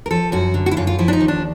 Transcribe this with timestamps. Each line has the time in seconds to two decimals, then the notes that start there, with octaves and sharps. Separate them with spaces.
0.06 A#4
0.11 F3 A4
0.32 F#2 F#4
0.54 D3
0.66 F#4
0.71 E4
0.77 F#2 F4
0.87 F4
0.98 F3 E4
1.08 D4
1.13 D#4
1.21 D#2
1.28 D4